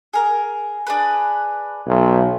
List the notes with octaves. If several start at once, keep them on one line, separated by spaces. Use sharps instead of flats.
G#4 A#4
D4 G#4 B4
B1